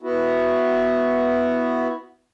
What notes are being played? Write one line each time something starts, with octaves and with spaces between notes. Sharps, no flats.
B3 E4 F#4